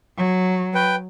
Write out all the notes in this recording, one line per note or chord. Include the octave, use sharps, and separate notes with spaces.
F#3
B4 G5